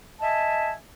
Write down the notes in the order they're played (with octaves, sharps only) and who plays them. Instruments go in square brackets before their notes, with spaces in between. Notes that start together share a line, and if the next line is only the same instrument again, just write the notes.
[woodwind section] D#5 E5 G#5 A5